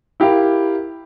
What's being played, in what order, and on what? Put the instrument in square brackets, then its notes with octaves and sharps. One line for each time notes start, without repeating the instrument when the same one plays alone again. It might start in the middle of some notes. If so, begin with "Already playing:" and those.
[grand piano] E4 G4 A#4 F5